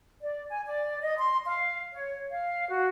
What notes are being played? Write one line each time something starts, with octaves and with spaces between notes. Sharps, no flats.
D5
G#5
D5
D#5
C6
F5
C#5
F5
F#4